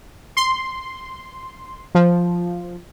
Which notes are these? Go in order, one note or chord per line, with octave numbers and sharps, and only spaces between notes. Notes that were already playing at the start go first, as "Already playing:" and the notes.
C6
F3